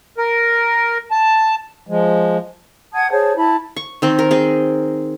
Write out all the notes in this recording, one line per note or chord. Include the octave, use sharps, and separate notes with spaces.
A#4
A5
F3 G#3
F#5 A5 D#6 G#6
G#4 C5 C#5 A5
E4 A5 B5
C#6
D#3 C4
A#4
C4 G#4